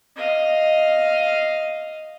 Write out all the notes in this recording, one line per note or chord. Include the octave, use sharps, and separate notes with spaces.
D#5 F5